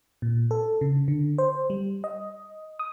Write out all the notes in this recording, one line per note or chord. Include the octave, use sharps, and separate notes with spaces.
A#2
A4
C#3
D3
C5
G3
D#5
D#6